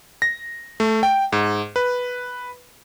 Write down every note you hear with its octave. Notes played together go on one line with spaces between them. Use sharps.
A#6
A3
G5
G#2
B4